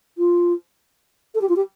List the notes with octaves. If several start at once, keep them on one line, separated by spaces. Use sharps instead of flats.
F4
A4
G4
F4
G4